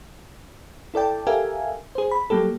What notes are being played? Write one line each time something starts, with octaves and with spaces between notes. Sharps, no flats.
E4 A4 D5 G5 A5
G4 A4 A#4 E5 F5 G#5
G#4 C5
B5
F#3 G3 A#3 G4 A4